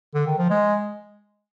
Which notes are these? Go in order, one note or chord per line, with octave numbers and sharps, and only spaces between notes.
D3
D#3
F3
G#3